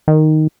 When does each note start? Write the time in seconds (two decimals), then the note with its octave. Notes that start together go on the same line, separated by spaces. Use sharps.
0.08 D#3